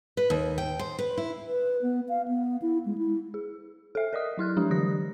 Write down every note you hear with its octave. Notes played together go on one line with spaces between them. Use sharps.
B4
D#2
G5
C5
B4
E4
B4
B3
F5
B3
E4
G#3
E4
G#4
A4 E5
A#4 D5 D#5 D#6
F#3 E4 F6 F#6
F3 G#3 D4 G4
D3 E3 F#3 G4 D#6 A#6